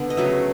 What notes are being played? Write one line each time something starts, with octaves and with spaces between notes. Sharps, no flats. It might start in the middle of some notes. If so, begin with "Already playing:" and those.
Already playing: D3 B3
D#5
C#3 F#3 A3 E5